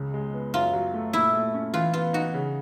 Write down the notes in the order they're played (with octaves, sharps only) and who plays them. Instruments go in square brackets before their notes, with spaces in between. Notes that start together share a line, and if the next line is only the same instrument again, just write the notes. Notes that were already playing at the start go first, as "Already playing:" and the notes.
Already playing: [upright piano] C#2 C#3
G#3
B3
[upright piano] F#2 [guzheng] F4
[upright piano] F#3
A3
[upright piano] A#2 [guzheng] E4
[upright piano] A3
C#4
[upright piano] E3 [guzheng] F4
[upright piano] B3 [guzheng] F4
[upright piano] D#4 [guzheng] F#4
[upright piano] C#3